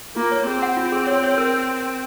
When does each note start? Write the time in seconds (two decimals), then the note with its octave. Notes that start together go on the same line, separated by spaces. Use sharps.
0.16 A#3 F4
0.31 C#5
0.47 C4 G#4
0.62 F#5
0.77 F4
0.92 G#4
1.07 C#5
1.23 C#5
1.38 A#4